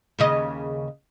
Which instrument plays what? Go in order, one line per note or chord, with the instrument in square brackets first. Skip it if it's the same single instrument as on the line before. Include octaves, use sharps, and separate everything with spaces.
[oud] D#2 C#3 D#5